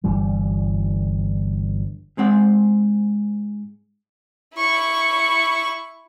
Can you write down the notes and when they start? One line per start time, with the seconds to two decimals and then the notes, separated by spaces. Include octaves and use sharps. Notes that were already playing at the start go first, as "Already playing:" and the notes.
0.04 G1 G2 E3 G3
2.17 G#2 G#3 C4 F#5
4.55 E4 C#6